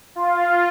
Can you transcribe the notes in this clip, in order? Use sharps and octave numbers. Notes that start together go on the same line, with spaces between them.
F4